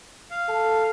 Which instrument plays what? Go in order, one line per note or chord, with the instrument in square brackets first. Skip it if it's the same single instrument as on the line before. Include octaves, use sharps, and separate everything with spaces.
[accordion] F5
[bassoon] A4